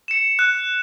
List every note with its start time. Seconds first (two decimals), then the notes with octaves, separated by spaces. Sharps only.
0.08 C#7 E7
0.39 F#6